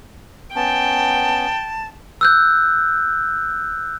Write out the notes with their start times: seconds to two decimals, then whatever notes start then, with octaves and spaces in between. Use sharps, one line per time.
0.55 B3 C#4 G5 A5
2.21 E6 F#6 G6